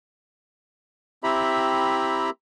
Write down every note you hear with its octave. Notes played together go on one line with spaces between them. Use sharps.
C4 E4 G4 E5 A#5 B5